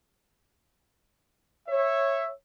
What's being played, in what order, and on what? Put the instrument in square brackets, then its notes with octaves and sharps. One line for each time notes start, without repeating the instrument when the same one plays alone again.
[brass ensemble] C#5 E5